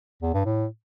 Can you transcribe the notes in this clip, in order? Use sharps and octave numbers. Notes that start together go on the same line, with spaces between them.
E2
G2
A2